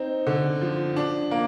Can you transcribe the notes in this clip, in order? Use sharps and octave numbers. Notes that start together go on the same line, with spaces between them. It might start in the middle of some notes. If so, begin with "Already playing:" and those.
Already playing: C4 D#4
D3
F3
D4
A#3